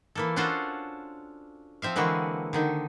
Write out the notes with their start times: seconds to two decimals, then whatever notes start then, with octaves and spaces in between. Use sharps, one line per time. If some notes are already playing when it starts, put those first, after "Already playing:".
0.15 E3 A#3 A4
0.36 C#4 D4 F4 F#4 A4 C5
1.82 F3 C4 E5 F5
1.96 D3 E3 G#3 A#3 F#4
2.53 D3 D#3 D#4